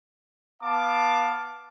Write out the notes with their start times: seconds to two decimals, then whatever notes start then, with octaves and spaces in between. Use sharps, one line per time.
0.62 B3 F5 A5 D6